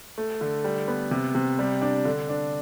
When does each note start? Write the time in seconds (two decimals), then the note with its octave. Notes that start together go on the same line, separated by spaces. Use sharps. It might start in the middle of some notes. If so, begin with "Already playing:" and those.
0.18 A3
0.41 D3
0.64 G3
0.88 B3
1.11 C3
1.35 C3
1.59 G3
1.82 D4
2.05 D3
2.29 D4